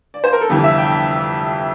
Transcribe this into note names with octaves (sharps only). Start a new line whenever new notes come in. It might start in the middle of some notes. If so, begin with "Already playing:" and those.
D5
C5
A#4
A4
G1 F2 C3 E3 G4
E5
G5